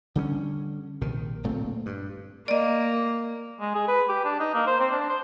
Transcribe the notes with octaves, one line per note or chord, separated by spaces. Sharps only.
D3 G3 C4 C#4
A#1 C3 D#3
D1 A#2 A3 C4
G2
A#3 D5 D#5
G#3
G#4
B4
G4
D4
D#4
A#3
C5
C4
D4
C5